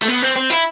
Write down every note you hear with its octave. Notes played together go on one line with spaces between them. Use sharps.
A3
B3
C4
C4
E4